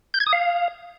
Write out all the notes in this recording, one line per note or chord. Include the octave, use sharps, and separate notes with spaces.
G6
G#6
D#6
F5